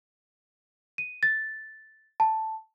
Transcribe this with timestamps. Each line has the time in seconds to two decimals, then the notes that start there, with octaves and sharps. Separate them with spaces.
0.98 D#7
1.23 A6
2.20 A5